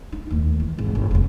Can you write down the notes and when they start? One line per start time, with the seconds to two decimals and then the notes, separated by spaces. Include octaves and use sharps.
0.12 D#4
0.31 D#2 A3
0.60 E3
0.79 G#1
0.95 G1
1.11 F1 D#2